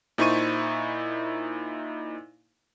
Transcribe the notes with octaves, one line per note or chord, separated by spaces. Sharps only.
A#2 D#4 E4 C5 C#6 D#7